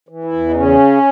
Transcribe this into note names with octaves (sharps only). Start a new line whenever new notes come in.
E3
E4
E2
D#4
C#3 C#4